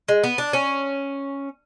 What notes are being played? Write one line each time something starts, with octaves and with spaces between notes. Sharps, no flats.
G#3
B3
D4
C#4